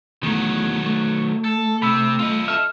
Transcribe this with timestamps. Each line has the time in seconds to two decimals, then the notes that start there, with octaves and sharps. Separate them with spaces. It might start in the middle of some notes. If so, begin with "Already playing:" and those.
0.23 E2 D#3 F#3 A3
0.86 A3
1.44 A4
1.82 C3 B5 E6
2.19 F4 D#5
2.48 A4 E5 F6